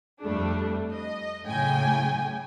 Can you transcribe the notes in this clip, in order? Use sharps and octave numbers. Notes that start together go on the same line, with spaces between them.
F2 G3 A3 D4
D#5
A2 C#3 F#3 G5 G#5